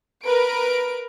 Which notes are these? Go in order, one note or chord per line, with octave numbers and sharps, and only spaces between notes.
A#4 B4 D7